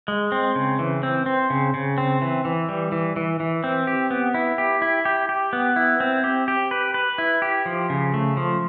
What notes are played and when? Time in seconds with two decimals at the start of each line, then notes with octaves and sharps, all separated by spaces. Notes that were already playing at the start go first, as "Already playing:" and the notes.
0.08 G#3
0.32 C4
0.56 C#3
0.79 E3
1.03 C4
1.26 C4
1.50 C#3
1.74 C#3
1.98 C4
2.21 E3
2.45 E3
2.69 G3
2.92 E3
3.16 E3
3.40 E3
3.64 C4
3.87 G4
4.10 B3
4.34 E4
4.58 G4
4.82 E4
5.05 G4
5.29 G4
5.53 B3
5.76 E4
6.00 C4
6.24 G4
6.48 G4
6.71 B4
6.94 B4
7.18 E4
7.42 G4
7.66 F3
7.90 C#3
8.14 A3
8.37 F3